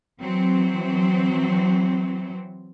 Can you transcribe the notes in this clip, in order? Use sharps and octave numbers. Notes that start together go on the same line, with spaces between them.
E3 F#3 C4